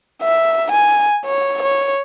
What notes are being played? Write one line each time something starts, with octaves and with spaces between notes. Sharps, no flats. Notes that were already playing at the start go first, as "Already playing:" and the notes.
E5
G#5
C#5
C#5